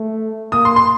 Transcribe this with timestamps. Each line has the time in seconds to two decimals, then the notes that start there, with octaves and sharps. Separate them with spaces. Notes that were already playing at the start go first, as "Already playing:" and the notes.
Already playing: A3
0.52 A#3 D#6
0.65 C6
0.76 C6